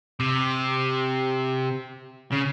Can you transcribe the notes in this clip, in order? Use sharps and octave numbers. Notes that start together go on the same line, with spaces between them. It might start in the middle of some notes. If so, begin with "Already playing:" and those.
C3
C#3